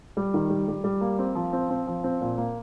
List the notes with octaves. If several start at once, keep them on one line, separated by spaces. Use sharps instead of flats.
G3
D#3
G3
G3
G3
A#3
C4
F3
C4
C4
F3
C4
A#2
A#3